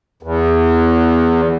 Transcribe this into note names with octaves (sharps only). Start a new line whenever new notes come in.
E2